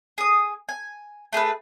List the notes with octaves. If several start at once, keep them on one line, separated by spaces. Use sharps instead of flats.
G#4 D#6
G#5
A3 G#4 A#4 B4